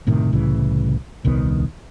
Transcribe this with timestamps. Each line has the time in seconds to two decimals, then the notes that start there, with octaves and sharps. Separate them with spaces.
0.07 F#1 A2 C3 D#3
0.32 C2 A2 C#3 E3
1.25 D#1 C2 D#3 B3